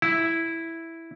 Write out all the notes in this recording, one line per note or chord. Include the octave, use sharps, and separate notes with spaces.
E4